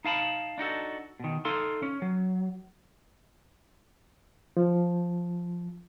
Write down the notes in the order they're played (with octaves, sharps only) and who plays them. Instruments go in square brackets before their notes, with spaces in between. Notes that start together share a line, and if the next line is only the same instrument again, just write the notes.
[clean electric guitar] D#4 F5 A5 B5
D4 D#4 F#4 A4
B2 D#3
D#4 A4 F5 C6
C#4
F#3
[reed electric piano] F3